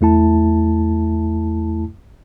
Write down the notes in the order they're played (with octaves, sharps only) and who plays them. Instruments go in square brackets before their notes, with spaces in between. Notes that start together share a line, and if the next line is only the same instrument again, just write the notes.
[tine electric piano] E2 A3 E4 A5